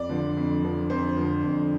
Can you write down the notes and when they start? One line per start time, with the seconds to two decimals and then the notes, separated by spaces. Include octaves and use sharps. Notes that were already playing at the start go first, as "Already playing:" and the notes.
Already playing: F2 D5
0.09 D3 F3
0.37 F2
0.63 D3 F3
0.90 F2 C5
1.17 D3 F3
1.44 F2